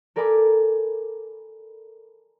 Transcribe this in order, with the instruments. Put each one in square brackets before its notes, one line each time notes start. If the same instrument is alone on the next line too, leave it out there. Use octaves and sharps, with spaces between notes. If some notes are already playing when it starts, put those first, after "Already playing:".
[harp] A4 A#4 D5 G#5 B5 D6